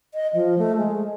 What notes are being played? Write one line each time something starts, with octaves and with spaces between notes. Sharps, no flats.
D#5
F3
A3
G#3